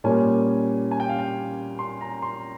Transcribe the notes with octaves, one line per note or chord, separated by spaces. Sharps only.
A#2 G3 A#3 C#4 G#5
G#5
G5
F5
G5
C6
A#5
C6